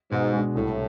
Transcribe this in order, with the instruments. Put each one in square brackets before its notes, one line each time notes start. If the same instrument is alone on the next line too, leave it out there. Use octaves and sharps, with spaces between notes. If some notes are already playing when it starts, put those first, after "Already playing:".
[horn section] G#2 [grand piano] B2
[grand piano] G#3 D4
[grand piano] C2 [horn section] A2